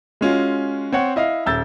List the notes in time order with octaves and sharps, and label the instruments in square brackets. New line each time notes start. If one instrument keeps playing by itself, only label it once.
[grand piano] G#3 C#4 F4 F#4
C4 C#5 F#5
E4 D#5 F5
D#1 E5 E6 G6 A6